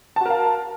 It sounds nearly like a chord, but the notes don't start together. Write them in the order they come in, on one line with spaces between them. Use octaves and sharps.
A5 F#4 A#4 F5